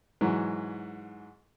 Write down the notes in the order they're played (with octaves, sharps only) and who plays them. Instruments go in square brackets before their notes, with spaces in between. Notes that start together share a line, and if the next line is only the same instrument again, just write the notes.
[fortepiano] G#2 E3 F#3